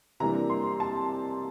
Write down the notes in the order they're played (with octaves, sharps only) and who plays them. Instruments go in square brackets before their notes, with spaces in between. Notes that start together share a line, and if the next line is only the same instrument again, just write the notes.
[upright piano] C3 E3 G3 A#3 D4 A#5
C6
A5